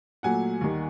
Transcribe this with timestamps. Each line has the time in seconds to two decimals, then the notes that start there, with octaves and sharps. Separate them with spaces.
0.23 A#2 F#3 A3 F#5 G#5
0.61 D#2 D#3 G3